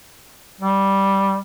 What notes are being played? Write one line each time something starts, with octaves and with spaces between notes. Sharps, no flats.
G3